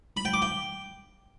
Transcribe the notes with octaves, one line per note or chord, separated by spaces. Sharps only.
B5
G5
D6
G5